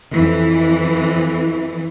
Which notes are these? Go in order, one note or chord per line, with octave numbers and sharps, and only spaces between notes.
F2 E3